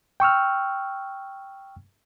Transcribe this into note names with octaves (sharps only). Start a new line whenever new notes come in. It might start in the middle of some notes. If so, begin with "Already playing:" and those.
G5 C#6 E6 F6